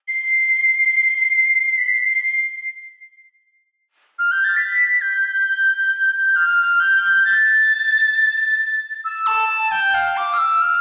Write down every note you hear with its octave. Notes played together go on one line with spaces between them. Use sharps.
C7
B6
C7
F6
G6
A6
B6
G6
F6
G6
A6
E6
A5
A5
G5
F5
D6
F6
E6
F6